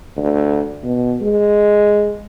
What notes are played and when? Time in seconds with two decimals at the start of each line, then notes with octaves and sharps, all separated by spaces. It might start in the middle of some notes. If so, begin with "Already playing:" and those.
0.17 D2
0.84 B2
1.21 G#3